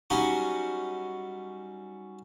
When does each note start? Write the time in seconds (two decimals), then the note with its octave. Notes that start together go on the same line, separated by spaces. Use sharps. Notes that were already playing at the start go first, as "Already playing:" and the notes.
0.10 F#3 G3 C#4 D#4 F#4